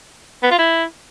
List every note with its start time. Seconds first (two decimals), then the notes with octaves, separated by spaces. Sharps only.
0.43 B3
0.51 F4
0.59 E4